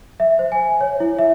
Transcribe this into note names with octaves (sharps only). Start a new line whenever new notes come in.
E5
C5
G#5
C#5
E4
E5